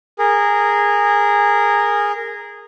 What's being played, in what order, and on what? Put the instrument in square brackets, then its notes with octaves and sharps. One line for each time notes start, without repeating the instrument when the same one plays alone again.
[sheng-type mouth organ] G#4 A#4